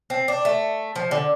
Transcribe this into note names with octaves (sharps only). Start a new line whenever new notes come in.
C4
D4
A3
F3
D3